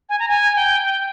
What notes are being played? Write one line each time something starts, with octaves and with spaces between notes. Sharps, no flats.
G#5
A#5
G#5
G5